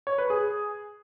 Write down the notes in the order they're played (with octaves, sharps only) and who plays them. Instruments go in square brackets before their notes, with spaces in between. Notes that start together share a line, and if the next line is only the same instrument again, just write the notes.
[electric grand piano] C#5
B4
G#4